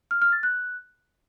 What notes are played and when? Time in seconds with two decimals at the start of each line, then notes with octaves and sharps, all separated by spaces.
0.11 F6
0.22 F6
0.32 A6
0.43 F#6